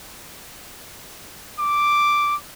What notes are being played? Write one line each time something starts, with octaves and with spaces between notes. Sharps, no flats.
D6